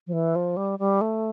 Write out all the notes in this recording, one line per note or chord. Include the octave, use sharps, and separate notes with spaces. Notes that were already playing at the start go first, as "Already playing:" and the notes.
F3
E3
F3
G3
G3
A3